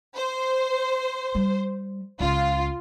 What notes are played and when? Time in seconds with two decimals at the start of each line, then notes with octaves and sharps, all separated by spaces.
0.16 C5
1.35 G3
2.20 C#2 F4